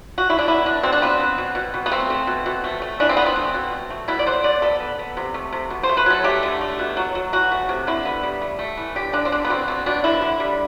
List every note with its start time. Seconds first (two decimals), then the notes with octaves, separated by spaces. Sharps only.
0.18 F#4
0.29 D3 E4
0.39 D4
0.47 B3 E4
0.66 D3 D4
0.83 B2 C4
0.92 D4
1.02 B3 C4
1.20 B3
1.38 B2
1.55 B2
1.74 B2
1.86 B3
1.92 A3 C4
2.10 A3
2.27 B2
2.46 B2
2.64 A3
2.82 A3
3.00 E3 D4
3.09 C4
3.17 A3 B3
3.26 C4
3.36 A3
3.54 B2
3.72 A3
3.90 A3
4.08 B2 E4
4.19 D5
4.26 B3 C5
4.44 B2 D5
4.62 B3 A4
4.80 B3
4.99 B3
5.17 C3
5.34 A3
5.52 C3
5.70 B2
5.83 C5
5.89 A3
5.97 B4
6.06 F#3 A4
6.24 A3 G4
6.43 D3
6.61 A3
6.79 B2
6.97 F#3
7.15 F#3
7.33 E3 F#4
7.51 A3
7.69 C3
7.87 D3 E4
8.05 B3
8.23 G3
8.41 A3
8.59 A3
8.77 E3
8.95 D3 G4
9.13 D3 D4
9.25 C4
9.32 D3 D4
9.45 B3
9.50 B2 C4
9.68 B2 C4
9.86 B2 D4
10.04 D3 E4
10.22 D3
10.40 G3